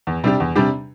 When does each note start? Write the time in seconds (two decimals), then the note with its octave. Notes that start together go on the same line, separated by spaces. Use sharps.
0.07 E2
0.24 C3 G3 D4 G4
0.40 E2
0.56 C3 G3 D4 G4